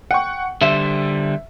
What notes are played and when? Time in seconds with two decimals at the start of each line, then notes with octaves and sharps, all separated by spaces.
0.11 F#5 G5 C#6
0.61 D3 G3 C5 E5